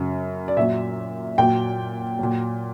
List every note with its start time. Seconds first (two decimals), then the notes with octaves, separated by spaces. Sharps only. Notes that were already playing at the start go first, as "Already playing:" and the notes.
Already playing: F#2 C#3 F#3
0.48 D5
0.57 A#2 F#3 E5
1.38 A#2 F#3 G5
2.19 A#2 F#3